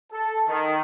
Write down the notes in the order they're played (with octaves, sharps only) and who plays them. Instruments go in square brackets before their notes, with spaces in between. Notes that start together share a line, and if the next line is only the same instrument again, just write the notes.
[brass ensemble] A4
D#3